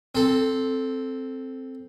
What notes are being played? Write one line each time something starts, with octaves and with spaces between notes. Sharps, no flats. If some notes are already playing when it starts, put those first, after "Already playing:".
C4 A4